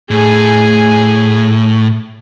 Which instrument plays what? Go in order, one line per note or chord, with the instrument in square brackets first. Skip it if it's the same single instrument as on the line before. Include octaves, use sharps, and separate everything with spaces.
[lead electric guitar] A2 [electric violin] G#4 G#5